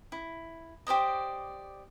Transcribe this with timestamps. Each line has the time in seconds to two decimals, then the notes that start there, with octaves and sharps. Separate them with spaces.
0.12 E4
0.87 G4 C5 D5 D#5